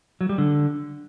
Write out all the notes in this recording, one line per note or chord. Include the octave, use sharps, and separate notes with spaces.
F#3
G3
D3